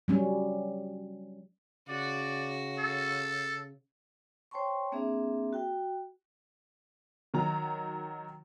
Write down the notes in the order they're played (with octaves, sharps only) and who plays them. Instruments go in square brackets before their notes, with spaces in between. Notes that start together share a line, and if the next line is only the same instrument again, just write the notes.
[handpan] F#3 G3 C#4
[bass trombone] C#3 [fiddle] F#4 [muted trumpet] D5
[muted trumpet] A4
[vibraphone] C5 C#5 G5 A5 C6 C#6
A#3 C4 D4 G#4 E5
F#4 G5
[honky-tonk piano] D#3 F#3 A#5